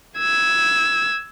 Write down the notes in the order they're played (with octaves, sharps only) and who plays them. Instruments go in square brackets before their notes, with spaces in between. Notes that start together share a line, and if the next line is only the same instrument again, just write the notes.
[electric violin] E6 G#6